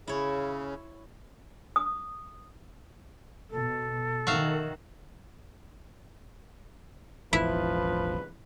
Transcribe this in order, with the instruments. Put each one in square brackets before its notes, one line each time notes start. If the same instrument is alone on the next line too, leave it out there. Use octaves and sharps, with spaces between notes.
[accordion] C#3 [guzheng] E4 C#5
[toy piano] D#6
[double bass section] B2 [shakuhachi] A4
[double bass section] D#3 [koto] F#4 E5 F5
[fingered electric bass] E1 A1 [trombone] F3 [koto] E4 [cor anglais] B4